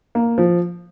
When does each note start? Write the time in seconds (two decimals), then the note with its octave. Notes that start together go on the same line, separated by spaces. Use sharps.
0.15 A#3
0.38 F3